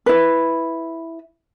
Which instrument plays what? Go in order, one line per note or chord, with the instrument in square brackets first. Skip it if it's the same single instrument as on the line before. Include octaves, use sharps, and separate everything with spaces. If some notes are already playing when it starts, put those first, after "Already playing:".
[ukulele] E4 B4